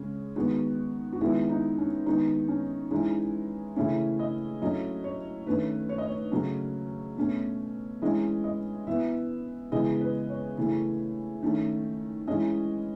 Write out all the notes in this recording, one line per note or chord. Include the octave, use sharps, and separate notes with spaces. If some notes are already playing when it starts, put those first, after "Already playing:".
Already playing: C#3 G#3 C#4
D#3 G#3 B3 F#4
F#4
D#3 G#3 B3 E4
D#4
C#4
D#3 G#3 B3 D#4
C#4
E3 G#3 C#4 D#4
C#3 E3 A3 C#4 E4
D#5
A2 F#3 A3 C#4 D#5
C#5
D#3 A3 C#4 B4
C#5
D#5
C#5
C#3 F#3 A3 C#4
B2 A3 C#4
E3 G#3 C#4 D#5
D#5
E3 B3 E5
C#3 E3 G#3 B3 D#5
B4
C#5
C#3 E3 A3
D#3 A3 C#4
E3 G#3 C#4 D#5